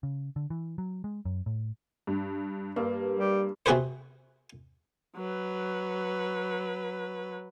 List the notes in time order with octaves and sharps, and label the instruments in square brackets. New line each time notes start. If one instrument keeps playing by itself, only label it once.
[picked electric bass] C#3
D3
E3
F#3
G#3
F#2
A2
[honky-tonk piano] G2
[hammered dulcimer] G2 [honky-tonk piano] A#3
[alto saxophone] G3
[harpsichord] C3 C4 F#4 G#4 B4 C5
[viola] F#3 B4